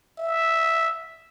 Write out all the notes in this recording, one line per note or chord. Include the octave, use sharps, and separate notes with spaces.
E5